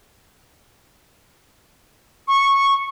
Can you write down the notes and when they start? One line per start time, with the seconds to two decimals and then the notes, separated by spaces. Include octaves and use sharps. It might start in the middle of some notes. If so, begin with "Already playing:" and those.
2.28 C#6